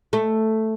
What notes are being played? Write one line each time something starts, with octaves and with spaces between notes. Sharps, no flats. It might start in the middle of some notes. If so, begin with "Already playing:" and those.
A3